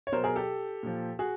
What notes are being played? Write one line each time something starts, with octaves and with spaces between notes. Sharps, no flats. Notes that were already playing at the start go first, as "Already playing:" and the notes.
C#5
B2 F#3 A#4 C5
G#4 A#4
G4 A4
A#2 F3
F#4 G#4